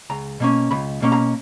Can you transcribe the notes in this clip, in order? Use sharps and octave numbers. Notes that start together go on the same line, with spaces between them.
C#2 A#5
B2 A#3 C#4
C#2 B5
B2 A#3 C#4
A#5